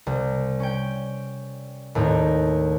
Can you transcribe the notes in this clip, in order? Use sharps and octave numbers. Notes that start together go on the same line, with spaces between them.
C2
C#4 G5
D#2 A2 C4 D4 D#4